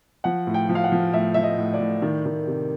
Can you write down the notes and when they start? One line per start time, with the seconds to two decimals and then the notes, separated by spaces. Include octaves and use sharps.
0.24 F3 F#5
0.47 A2
0.54 G5
0.69 F3
0.75 F5
0.84 F#5
0.92 F3
1.13 A2 E5
1.34 F3 E5
1.43 D#5
1.58 A2
1.74 D5
1.80 A2
2.02 D#3
2.26 D#3
2.47 C3